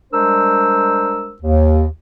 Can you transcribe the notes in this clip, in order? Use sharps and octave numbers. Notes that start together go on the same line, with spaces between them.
G3 G#3 D4 A#4 C5 E6
D#2